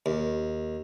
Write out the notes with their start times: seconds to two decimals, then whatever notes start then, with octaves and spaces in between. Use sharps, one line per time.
0.06 D#2